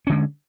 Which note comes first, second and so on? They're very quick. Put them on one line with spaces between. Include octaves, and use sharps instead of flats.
C#4 D3 G#3